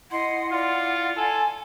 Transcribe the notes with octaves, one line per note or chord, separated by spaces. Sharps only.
E4 D#5 F#5 C6
F4 D5 F#5
A4 G#5